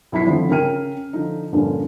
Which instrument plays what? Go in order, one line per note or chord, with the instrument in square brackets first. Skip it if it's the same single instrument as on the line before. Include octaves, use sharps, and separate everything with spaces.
[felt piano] B1 E4 B5 B6 C7
G#1 D3 F3
C#3 A#4 G5 F6 D#7
D3 F3 D#4
A#1 G2 A#2 D3 C#4